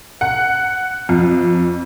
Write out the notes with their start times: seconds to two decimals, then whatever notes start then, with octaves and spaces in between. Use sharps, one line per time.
0.21 F#5
1.09 F2